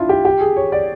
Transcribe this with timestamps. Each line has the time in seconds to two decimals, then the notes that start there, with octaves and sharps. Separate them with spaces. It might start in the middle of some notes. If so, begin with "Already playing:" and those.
Already playing: D4 E4 F4
0.09 G4
0.25 G4
0.41 G#4
0.56 C#5
0.72 D5